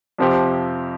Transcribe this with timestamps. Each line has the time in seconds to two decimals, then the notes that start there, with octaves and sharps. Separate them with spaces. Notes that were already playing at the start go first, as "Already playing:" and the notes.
0.18 F2 C3 F3 C4 G4